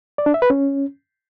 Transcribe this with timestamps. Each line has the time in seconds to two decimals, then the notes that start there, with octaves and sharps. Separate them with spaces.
0.18 D5
0.26 D4
0.34 E5
0.42 B4
0.50 C#4